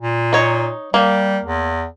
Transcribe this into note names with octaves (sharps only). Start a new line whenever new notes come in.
A#2
D#4 C#5
G3 A#3
E2